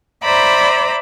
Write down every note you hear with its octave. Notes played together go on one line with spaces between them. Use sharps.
C5 D5 E5 A#5 B5 D6